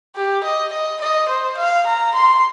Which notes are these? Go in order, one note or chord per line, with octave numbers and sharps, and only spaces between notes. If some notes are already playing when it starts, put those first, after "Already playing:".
G4
D#5
D#5
D#5
C5
F5
A#5
C6